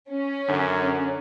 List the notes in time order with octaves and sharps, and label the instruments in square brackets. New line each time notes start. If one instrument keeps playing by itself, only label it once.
[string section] C#4
[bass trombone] F#2 [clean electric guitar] D3